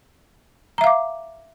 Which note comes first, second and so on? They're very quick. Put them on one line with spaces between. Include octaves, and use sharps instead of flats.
A#5 E5 F5 D6